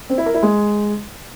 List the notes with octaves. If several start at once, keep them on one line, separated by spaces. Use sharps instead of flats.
C4
E4
A#4
E4
G#3